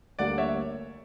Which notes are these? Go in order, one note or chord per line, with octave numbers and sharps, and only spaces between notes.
D2 D3 G3 A#3 D5 F#5
C#5 E5